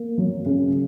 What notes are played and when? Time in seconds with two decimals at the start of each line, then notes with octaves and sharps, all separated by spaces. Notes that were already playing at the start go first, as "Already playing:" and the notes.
Already playing: A#3
0.18 F#3
0.46 C#3